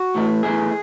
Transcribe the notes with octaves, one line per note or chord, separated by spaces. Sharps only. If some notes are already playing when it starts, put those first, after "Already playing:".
Already playing: F#4
A2 E3 A3
A2 E3 A3 G#4